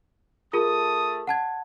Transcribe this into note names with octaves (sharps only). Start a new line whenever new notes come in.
A3 F4 G#4 A#4 A5 D#6
F#5 A5 G#6